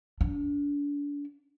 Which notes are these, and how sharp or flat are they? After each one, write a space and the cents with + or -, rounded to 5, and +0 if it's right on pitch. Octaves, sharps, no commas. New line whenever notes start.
D4 -35